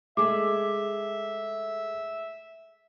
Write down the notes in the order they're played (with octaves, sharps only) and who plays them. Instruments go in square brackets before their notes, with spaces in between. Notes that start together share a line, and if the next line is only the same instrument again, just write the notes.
[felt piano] G#3 A3 G#4 [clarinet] E5 [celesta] D6